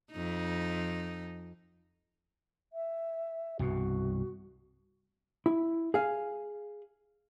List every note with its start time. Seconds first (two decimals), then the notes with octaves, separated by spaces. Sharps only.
0.12 F2 D#4
2.72 E5
3.59 C2 G2 B2 F#4
5.46 E4
5.94 G#4 F5